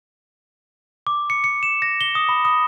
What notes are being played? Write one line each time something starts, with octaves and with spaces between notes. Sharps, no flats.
D6
C#7
C#7
E7
A#6
G7
D#6
B5
D#6